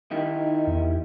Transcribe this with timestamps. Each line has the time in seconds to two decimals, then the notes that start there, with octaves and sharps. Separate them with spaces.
0.11 D#3 D#4 E4 G4
0.67 E2